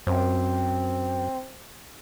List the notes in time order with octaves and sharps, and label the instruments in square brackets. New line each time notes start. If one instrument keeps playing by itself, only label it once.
[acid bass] F#2 [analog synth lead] C4